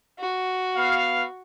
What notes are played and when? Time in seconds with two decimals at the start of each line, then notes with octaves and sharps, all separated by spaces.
0.19 F#4
0.77 B3 F5